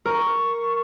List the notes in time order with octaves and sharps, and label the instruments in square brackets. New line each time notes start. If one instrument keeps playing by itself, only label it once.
[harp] A#4 [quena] C#6